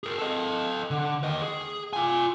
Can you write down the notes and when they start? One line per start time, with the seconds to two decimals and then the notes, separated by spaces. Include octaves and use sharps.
0.04 G#4 A#4
0.18 A4 D#5
0.91 D3
1.24 D#2 D#5
1.42 G#4
1.93 F4 G#5